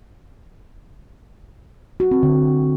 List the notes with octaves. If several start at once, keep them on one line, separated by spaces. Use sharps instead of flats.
F#4
C4
D3